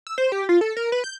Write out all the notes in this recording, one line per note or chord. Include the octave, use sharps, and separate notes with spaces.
E6
C5
G4
F4
A4
A#4
B4
G6